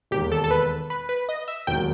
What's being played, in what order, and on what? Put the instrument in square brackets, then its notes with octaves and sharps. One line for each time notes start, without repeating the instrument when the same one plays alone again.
[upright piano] E1 D#2 D#3 [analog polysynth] G4
[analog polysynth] A4
A4
B4
B4
B4
D#5
E5
[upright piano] E1 D#2 D#3 F#3 [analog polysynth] G5